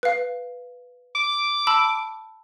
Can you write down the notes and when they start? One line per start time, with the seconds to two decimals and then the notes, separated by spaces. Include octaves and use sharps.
0.03 B4 F5
1.15 D6
1.67 A5 B5 E6